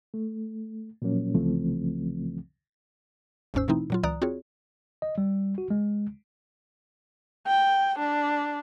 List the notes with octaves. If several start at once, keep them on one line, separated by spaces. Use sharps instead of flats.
A3
A#2 F3 F#3 A#3 C#4
C2 C#3 E3 F3 A3 C4
G1 D#2 G#2 C#4 C5 E6
B2 E3 A3 C4 D#4 E4
A#2 F#3 F4
C#2 E3 D5 A#5 D#6 F#6
C4 F4 F#4 G#4 C#5
D#5
G3
F#4
G#3
G5
D4